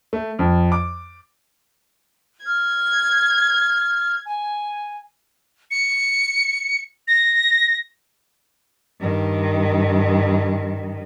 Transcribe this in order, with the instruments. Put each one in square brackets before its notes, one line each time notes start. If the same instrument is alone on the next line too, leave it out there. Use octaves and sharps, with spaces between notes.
[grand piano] A3
F2
D6
[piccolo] F6 [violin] G#6
[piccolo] G#5
C#7
A#6
[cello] G2 D#3